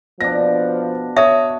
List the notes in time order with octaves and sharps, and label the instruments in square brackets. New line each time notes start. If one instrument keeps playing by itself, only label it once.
[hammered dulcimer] B2 D4 [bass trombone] F3 [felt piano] A#6
[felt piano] C#5 D#6 [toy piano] E5